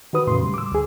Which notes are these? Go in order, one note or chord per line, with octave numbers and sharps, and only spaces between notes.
D#3 F#4 B4 D#6
E2 A2 C#3 C6
G3
D6 E6
D2 G#4